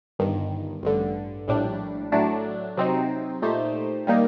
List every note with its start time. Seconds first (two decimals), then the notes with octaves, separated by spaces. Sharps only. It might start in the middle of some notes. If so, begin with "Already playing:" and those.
0.19 G1 G2 D#3
0.83 A1 G2 D3
1.48 A#1 A2 G3 D4
2.12 A2 F#3 A3 D4
2.77 C3 F#3 C4 D#4
3.42 A#2 A3 D#4 G4 C5
4.07 D#3 G3 A#3 D#4